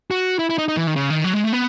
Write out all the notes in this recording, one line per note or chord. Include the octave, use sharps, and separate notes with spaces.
F#4
E4
E4
D#4
D#4
E3
D#3
C#3
D#3
F#3
G#3
A3
B3